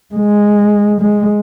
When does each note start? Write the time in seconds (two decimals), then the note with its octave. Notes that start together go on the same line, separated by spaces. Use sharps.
0.15 G#3
1.01 G#3